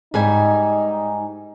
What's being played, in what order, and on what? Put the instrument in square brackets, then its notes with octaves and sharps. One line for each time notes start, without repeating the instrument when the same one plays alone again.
[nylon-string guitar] G#2 G3 G#5 [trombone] D#4